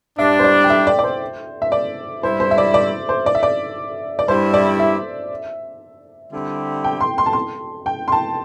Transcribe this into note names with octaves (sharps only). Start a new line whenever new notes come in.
G2 G3 D4 E5
C5
D5
G5
E5
D5
D5
C5
E5
D5
G2 G3 E4 C5
C5
E5
D5
D5
C5
D5
E5
D5
D5
G2 G3 E4 C5
D5
E5
D3 G3 C4 E4 G4
G5
C6
C6
A5
C6
G5
C6
A5